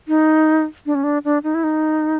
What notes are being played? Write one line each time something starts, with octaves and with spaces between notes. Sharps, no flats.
D#4
D4
C#4
D4
D4
D#4
E4
D#4